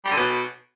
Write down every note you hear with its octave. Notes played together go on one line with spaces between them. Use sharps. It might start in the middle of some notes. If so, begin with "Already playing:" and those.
G3
D3
B2